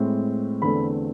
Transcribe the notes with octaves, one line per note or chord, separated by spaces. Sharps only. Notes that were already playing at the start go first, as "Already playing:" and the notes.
Already playing: A2 G#3 C4
E2 D3 A3 C4 B5